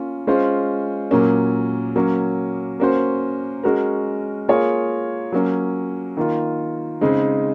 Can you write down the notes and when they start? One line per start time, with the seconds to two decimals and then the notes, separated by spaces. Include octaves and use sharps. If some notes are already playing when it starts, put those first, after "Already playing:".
Already playing: A#3 C#4 F4
0.27 G#3 C#4 F4 C5
1.11 A#2 F#3 A#3 C#4
1.96 F#3 A#3 C#4
2.80 A#3 C#4 F#4 C5
3.63 G#3 C#4 F#4 A#4
4.49 A#3 F4 G#4 C#5
5.32 F#3 A#3 C#4
6.17 D#3 A#3 F4
7.01 C#3 G#3 C4 D#4